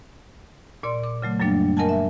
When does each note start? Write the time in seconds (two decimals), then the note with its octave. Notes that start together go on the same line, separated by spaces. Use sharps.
0.83 A#2 D5 C6
1.03 D6
1.22 C#3 F#3 A3
1.39 F#2 F#3 G3 A#3 D4
1.77 A#4 D#5 F#5 G#5 A5
1.89 E5